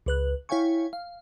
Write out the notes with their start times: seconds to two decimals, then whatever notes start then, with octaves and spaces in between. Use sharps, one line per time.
0.06 C#2 B4 F#6
0.49 E4 C#5 F5 G5 G#5 C#6
0.93 F5